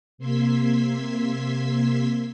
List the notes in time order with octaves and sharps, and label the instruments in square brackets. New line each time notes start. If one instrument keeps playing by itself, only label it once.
[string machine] C3 A#3 C6 E6 G#6 B6